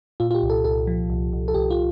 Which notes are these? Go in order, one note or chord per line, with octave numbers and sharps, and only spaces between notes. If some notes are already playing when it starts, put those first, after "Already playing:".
A#2 F4
F4
G4
C2
A4
C2 A4
F3
C2
C2
A4
C2 G4
F4